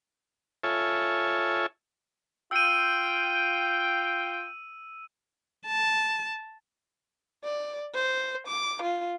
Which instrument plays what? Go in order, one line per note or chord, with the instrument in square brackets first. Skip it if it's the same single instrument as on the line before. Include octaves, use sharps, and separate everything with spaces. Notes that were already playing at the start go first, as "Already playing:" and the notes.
[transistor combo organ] F4 A4 C#5 E5 G#5
[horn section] F4 G5 [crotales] E6 D#7
[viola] A5
[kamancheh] D5
C5
D6
F4